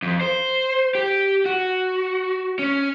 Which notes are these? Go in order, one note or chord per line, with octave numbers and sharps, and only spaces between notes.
F2
C5
G4
F#4
C#4